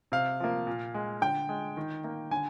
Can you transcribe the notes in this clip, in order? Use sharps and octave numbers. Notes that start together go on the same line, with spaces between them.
C3 F5
F3 A#3
A#2
G#3
D3 G5
G#3
D#3
A#3
D3 G#5